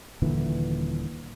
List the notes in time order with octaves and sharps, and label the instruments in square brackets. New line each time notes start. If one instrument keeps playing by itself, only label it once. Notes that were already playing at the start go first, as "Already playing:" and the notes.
[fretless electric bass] D#1 A#2 D3 E3